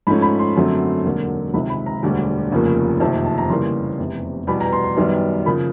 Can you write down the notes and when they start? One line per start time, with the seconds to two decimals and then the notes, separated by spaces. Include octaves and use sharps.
0.07 G#2 F3 A3 C#4 B5
0.22 B5
0.39 C6
0.56 F#2 D3 F#3 A3 C4
1.05 E1 D#2 D3 F#3 A#3
1.54 C#2 C3 D#3 B5
1.70 B5
1.86 A#5
2.03 E1 D2 D3 G3
2.52 F1 D#2 C#3 F3 A#3
3.00 F#1 F2 C3 D#3 A5
3.25 A5
3.38 A#5
3.49 D#2 C#3 E3 G3 A#3 C6
3.98 F1 E2 C3
4.47 E2 B2 G3 B3 B5
4.61 A#5
4.73 C6
4.84 C6
4.96 F#2 D#3 G3 B3
5.46 C#3 F3 A#3 B5